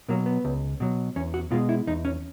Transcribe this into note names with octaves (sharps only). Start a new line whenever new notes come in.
B2 F#3 A#3
B3
C#2
B2 F#3
E2 C#4
F#4
B2 G#3 F4
E4
E2 D#4
C#4